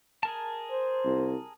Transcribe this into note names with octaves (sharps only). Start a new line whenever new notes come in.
G#4 A#4 A5
C5
C2